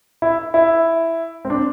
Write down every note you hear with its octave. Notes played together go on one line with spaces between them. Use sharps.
E4
E4
C4
D4